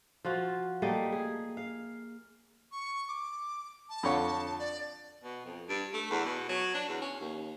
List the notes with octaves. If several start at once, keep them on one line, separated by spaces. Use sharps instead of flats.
F3 F4 F#4
G3 A3 A#3 D#5
G#4
F5
C#6
D6
A5
F2 D3 C#5
D5
B2
F2
G2
A3
E2
B2
F#3
D4
E2
C#4
D#2